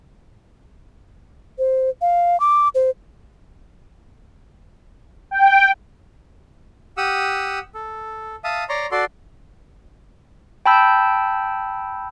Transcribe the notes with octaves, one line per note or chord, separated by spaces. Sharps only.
C5
F5
D6
C5
G5
G4 F#5 D#6 E6
A4
E5 F5 A5 D#6
C#5 D5 A#5 C6
F#4 A4 D5 C6
G5 A5 B5 E6 G6